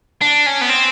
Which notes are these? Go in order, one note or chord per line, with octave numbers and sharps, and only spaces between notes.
D4
C#4
B3
C4